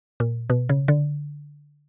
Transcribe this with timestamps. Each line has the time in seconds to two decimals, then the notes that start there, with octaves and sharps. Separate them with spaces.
0.20 A#2
0.50 B2
0.69 C#3
0.88 D3